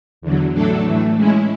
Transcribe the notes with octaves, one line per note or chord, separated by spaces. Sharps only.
E2 D3 F#3
A2 F#3 A3 D4 A4
A2 E3 A3
G#3 C#4 E4